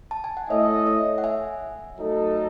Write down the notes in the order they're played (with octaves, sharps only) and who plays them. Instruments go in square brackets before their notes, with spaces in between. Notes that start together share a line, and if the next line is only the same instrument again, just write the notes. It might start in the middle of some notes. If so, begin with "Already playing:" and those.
[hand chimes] A5
G#5
F#5
[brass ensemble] A3 E4 A4 D#5 [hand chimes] C#5 E5
[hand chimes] C#5 E5
F#5
E5 G#5
[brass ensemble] F#3 A3 D#4 A4